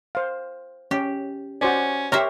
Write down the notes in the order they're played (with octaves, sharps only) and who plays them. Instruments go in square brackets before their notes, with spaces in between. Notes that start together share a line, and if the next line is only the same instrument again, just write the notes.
[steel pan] C5 F5
[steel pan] C#4 [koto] G4
[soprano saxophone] C#4 [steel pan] F#4 C5 D5
[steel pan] G4 C#5 [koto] A#4 C5 E5